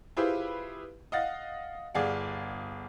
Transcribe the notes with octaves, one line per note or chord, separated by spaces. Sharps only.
E4 F4 G4 G#4 B4 C5
D#5 F5 F#5 A6
G1 G#4 D5 F5 F#5